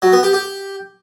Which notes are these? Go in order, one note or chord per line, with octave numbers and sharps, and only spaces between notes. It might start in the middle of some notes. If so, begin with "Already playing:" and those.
F#3
B3
G4
G4